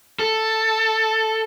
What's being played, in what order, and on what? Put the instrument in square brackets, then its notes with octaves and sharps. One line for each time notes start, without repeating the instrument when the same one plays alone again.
[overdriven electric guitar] A4